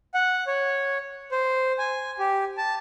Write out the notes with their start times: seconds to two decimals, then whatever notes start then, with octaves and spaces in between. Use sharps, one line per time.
0.14 F#5
0.47 C#5
1.32 C5
1.79 G#5
2.19 G4
2.57 A5